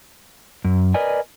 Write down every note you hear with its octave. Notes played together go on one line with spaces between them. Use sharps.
F#2
A#4 B4 D5 D#5 G#5